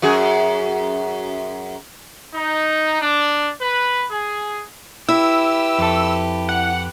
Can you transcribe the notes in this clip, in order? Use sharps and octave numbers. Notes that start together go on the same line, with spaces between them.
F#2 F#4 G#4
D#4
D4
B4
G#4
E4 G4 B4 E6
F2 A4
F#5